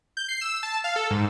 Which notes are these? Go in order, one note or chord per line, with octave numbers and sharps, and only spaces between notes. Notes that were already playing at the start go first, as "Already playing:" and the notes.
G6
C7
E6
A5
F5
A4
G#2